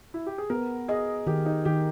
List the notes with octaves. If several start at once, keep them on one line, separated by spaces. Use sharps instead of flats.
E4
G4
G#4
B3 A#4
G#4 D#5
D#3 G4
D#4
D#3 G4